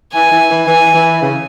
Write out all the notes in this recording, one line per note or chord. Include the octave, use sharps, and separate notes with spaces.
E3 G#5
E3
E3
E3 G#5
E3
C#3